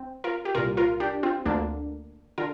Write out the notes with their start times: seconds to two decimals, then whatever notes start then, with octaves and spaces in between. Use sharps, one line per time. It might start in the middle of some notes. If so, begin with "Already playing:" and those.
Already playing: C4
0.24 F4 A#4
0.45 G4
0.55 C2 A#2 F4 A#4
0.77 F4 A#4
1.00 D4 G4
1.23 C4 F4
1.46 D2 D3 A#3 D4
2.38 D3 F4 A#4